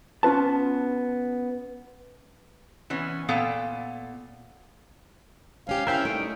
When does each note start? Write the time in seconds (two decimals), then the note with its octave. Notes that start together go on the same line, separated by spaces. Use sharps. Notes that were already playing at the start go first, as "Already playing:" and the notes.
0.23 B3 C#4 F4 B4 A5
2.90 E3 B3 C#4
3.29 A#2 B3 A4 F5 G5
5.67 G#2 C#4 G4 F5
5.87 C4 C#4 E4 A#4 E5 G5
6.05 G3 A3 D#4 D7